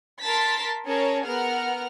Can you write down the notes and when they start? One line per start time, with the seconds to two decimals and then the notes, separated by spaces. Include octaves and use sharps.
0.22 A#4 A5 C6 A6 B6
0.86 C#4 G#4 A#4 C#5 A5
1.26 B3 A#4 F#5 F6